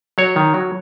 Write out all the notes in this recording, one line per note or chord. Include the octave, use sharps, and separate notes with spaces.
F#3 C#5
D#3
F#3